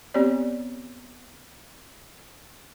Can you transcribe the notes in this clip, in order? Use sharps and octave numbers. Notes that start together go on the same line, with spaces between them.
B3 C4 G4 C#5 D5